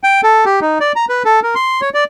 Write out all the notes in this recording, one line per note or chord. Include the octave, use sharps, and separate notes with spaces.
G5
A4
G4
D#4
D5
A#5
B4
A4
A#4
C6
C#5
D5